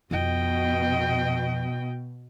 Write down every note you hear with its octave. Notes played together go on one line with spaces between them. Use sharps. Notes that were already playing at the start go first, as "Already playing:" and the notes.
F2 B2 D#5 G5